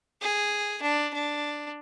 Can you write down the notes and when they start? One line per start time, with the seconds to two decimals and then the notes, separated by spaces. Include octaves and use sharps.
0.21 G#4
0.82 D4
1.14 D4